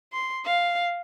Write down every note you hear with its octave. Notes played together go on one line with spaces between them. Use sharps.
C6
F5